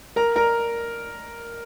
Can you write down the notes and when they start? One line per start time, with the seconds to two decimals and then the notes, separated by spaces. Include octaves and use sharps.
0.16 A#4 A#5
0.36 A#4 A#5